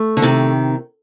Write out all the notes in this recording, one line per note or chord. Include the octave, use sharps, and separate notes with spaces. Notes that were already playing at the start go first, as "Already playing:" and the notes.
Already playing: A3
D3
C3 D#3